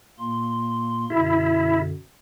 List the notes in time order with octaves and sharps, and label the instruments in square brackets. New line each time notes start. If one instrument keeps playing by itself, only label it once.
[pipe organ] A#2 A#3 C6
[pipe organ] F#2 B2 D3 [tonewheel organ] E4